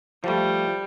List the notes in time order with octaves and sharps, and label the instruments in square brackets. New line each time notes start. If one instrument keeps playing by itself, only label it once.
[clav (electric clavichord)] F3 A3 [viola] G3